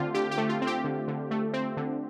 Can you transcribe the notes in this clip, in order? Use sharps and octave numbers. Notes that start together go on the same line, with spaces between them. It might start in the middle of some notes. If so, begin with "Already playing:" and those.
Already playing: D3 A3 C4 F4 G4
D3 G4
G4
A3
F4
C4
G4
D3
D3
A3
C4
D3